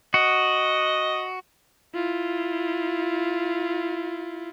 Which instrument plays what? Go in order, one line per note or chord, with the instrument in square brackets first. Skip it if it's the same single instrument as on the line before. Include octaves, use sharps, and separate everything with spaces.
[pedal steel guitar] F#4 [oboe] D#5
[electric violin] E4 F4